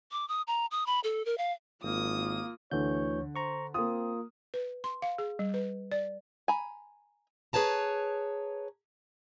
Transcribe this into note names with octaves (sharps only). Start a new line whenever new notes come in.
D6
D#6
A#5
D#6
B5
A4
A#4
F5
G#1 A#3 F4 D#6
D2 D3 E3 C#5 G6
C5 A#5 C#6
A#3 C4 F4 D#6
B4
C6
F5
G#4
G3
B4
D5
G#5 A#5 B5
G#4 B4 C#5 A5 A#5